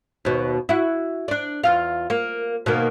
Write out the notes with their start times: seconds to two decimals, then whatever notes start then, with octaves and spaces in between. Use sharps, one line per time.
0.25 D#2 B2
0.69 E4 F#4
1.28 D4 D5
1.64 E2 F4 F5
2.10 A#3
2.66 B2 D#3 A#3